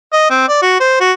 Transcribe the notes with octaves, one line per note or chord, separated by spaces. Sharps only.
D#5
C4
D5
F#4
C5
F#4